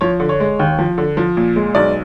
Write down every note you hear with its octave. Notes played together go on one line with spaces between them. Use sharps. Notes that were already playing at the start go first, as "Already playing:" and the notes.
F3 C#5
D3
C#5
G#3
D#2
F3
D3
F3
A#2
G#3
B1 D5